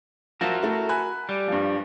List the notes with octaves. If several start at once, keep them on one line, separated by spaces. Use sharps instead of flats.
F3 F#4 A#4 E5
A3 E4
G#5 B5 F#6
G3
G2 F3